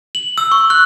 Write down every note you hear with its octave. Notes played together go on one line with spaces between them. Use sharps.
F#7
E6
C#6
F#6